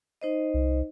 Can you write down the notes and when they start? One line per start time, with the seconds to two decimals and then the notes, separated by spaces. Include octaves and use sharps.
0.21 D#4 C5 D#5
0.54 C2